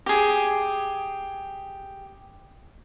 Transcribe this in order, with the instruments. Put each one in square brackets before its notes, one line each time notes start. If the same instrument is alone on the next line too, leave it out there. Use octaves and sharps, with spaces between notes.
[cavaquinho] G4 G#4